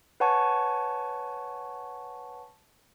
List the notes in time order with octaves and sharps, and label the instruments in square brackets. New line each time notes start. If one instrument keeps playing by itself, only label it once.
[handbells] B4 C#5 F#5 G#5 A5 C#6